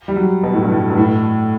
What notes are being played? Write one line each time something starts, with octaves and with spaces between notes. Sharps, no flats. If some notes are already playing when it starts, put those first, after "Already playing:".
G3
F#3
B2
A2
G2
A2
G2
A2